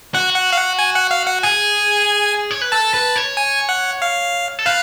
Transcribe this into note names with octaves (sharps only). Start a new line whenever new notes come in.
F#4 F#5
F#5
F5
F#5
G#5
F#5
F5
F#5
G#4 G#5
C#5
B4
A4 A5
B4
C#5
G#5
F#5
F5
A4
B4 F5